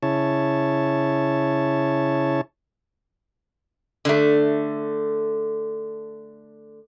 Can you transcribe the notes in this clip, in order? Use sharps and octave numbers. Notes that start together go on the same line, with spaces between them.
C#3 E4 C#5 A5
D3 A3